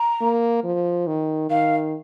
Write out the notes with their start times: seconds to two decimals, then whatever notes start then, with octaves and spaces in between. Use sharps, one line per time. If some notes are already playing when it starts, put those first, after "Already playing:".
Already playing: A#5
0.22 A#3
0.64 F3
1.07 D#3
1.50 D#3 F5